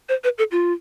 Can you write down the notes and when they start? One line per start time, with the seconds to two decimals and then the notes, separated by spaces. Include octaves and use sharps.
0.09 C5
0.24 B4
0.38 A4
0.51 F4